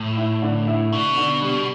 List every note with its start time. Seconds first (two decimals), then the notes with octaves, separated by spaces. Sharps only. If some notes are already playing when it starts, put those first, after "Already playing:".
Already playing: A2
0.17 E4
0.42 D3
0.67 E4
0.92 B2 D3
1.18 D3
1.42 G3